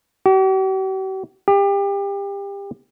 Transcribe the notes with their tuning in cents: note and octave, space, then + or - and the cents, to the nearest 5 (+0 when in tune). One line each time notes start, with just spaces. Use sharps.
G4 -45
G4 +30